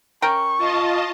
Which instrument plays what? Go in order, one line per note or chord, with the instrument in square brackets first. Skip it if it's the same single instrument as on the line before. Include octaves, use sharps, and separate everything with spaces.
[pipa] C#4 A#4 G5 [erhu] C#6
[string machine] F4 D#5 A5